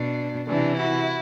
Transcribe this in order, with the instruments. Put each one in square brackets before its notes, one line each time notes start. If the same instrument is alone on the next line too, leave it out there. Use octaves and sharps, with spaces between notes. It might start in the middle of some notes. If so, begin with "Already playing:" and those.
Already playing: [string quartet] B2 D4
C3 E3 D4
E4 F#4